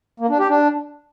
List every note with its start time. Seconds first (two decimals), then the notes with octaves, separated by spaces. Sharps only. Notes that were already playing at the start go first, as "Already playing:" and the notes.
0.20 A#3
0.29 D4
0.39 G4
0.49 D4